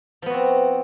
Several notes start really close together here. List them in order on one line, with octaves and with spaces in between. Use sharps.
F3 B3 F#4 C4